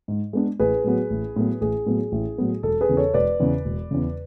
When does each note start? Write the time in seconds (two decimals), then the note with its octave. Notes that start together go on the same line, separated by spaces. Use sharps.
0.08 G#2
0.33 G#3 B3 D4
0.59 A1 G#4 B4
0.84 A2 F#3 B3
1.10 A1
1.36 A2 F#3 B3
1.61 A1 G#4
1.86 A2 F#3 B3
2.12 A1
2.38 A2 F#3 B3
2.63 E1 A4
2.81 G#4 B4
2.89 E2 C#3
2.97 A4 C#5
3.14 E1 B4 D5
3.40 E2 C#3
3.65 E1
3.91 E2 C#3